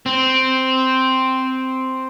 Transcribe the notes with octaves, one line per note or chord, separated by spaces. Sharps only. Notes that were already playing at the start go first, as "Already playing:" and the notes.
C4